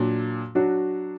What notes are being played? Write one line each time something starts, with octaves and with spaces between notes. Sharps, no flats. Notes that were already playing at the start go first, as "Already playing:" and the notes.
Already playing: A#2 F#3 D4
F#3 D4 F#4